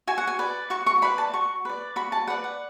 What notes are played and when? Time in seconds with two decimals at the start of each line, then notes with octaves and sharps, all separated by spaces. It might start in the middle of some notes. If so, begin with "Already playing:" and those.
0.07 F#4 G#5
0.18 F#5
0.27 G#5
0.39 B4 D5
0.70 F#4 C#6
0.86 C#6
1.02 B4 D5 B5
1.18 A5
1.33 F#4 C#6
1.65 B4 D5
1.96 F#4 B5
2.12 A5
2.27 B4 D5 F#5
2.44 F#5